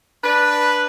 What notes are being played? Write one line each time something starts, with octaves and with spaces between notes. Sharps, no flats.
D4 B4